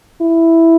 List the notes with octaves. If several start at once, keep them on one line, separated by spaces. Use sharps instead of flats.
E4